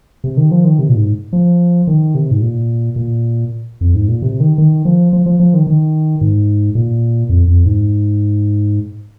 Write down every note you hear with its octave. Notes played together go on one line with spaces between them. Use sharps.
C3
D#3
F3
D#3
C3
A#2
G#2
F3
D#3
C3
G#2
A#2
A#2
F2
G#2
A#2
C3
D#3
D#3
F3
F3
F3
F3
D#3
D#3
G#2
A#2
F2
F2
G#2